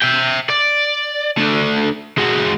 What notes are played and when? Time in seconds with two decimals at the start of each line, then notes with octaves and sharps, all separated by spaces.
0.02 E5 G5
0.50 D5
1.37 A3 D4
2.18 G#3 F#4